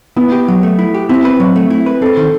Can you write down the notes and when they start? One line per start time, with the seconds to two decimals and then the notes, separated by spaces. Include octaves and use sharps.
0.16 B3 E4
0.32 G4
0.48 F#3
0.63 A3
0.79 E4
0.94 G4
1.09 C4 E4
1.25 B4
1.40 F#3
1.56 A3
1.70 E4
1.86 B4
2.02 C4 A4
2.17 D#3